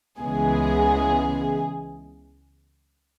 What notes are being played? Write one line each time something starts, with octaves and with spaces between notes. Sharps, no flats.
C#2 C#3 E3 G#3 B3 G#4